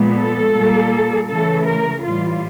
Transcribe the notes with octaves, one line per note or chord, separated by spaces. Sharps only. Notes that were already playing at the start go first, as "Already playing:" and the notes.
Already playing: A#2 F3 G#3 B3
A4
A#2 G3 A#3
C#3 E3 A3 A4
A#4
A2 E3 G3 F4